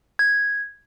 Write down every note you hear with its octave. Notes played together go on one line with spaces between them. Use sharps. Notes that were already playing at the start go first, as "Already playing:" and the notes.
G#6